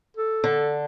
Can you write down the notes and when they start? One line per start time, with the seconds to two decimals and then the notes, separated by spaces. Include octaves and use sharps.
0.17 A4
0.44 D3